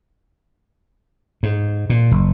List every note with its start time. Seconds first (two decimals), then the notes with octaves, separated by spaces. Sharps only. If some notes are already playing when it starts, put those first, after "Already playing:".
1.43 G#2
1.90 A#2
2.11 F#1